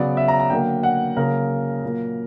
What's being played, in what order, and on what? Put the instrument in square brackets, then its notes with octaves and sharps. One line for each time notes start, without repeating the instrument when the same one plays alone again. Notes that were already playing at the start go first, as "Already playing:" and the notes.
Already playing: [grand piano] C#3 F#3 B3 D5
E5
A#5
A#5
D3 F#3 A#3 G5
F#5
C#3 F#3 A#3 A#4
A#2 F#3 A#3